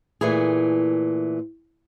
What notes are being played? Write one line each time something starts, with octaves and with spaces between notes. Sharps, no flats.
A#2 E3 A3 E4 G#4